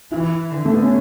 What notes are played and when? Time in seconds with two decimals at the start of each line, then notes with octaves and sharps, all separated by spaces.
0.11 E3 E4
0.52 D3
0.65 A3
0.74 B3
0.83 C#4